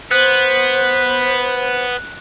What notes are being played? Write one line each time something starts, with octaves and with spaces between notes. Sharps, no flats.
B3 C5 F#6